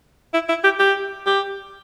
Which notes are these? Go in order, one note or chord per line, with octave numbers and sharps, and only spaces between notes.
E4
E4
G4
G4
G4